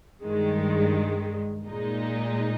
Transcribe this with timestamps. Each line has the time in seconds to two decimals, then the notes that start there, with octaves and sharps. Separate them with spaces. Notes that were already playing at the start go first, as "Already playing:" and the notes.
0.23 G2 D#3 G#3
1.66 A#2 G#3 D#4